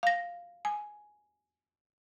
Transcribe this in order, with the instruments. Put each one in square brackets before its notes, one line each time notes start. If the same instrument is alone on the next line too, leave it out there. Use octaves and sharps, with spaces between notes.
[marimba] F5 A#6
G#5